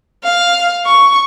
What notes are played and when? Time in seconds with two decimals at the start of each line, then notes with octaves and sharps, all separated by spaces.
0.24 F5
0.86 C#6